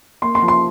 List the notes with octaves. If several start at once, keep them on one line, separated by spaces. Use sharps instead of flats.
A#3 C6
C6
F3
C6